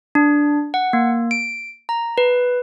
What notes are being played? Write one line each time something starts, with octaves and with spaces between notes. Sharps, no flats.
D4
F#5
A#3
D7
A#5
B4